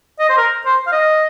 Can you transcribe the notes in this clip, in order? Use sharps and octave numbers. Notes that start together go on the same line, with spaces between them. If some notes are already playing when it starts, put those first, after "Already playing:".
D#5
C5
A#4
C5
F5
D#5